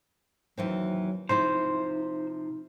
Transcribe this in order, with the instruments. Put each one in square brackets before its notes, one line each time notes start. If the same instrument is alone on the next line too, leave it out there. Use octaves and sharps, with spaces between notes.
[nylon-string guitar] D#2 E3 C4 [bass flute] F#3
[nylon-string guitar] C3 F3 E4 [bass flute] D#4 [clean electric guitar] C5